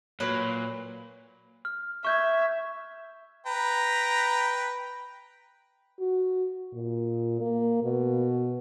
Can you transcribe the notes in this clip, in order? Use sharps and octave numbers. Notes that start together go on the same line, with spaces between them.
A#2 F#3 B4
F6
E5 C#6 G6 G#6
B4 G5 A#5
F#4
A#2
A#3
B2